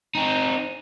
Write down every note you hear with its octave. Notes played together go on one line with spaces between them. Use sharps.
C4 D#4